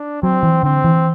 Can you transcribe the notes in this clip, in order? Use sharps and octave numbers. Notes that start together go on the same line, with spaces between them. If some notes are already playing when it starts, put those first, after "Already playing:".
Already playing: D4
F#3 C4
E3
D3 C4
E3